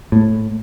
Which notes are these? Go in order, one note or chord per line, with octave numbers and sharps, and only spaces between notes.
A2